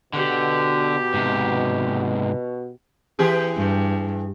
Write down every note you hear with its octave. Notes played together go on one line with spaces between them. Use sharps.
B2 D3 G4
G#2 C3
E3 G4 G#4
G2